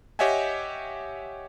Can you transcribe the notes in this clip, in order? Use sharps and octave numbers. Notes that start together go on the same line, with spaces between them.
G4 C#5 D#5 E5 F#5 G#5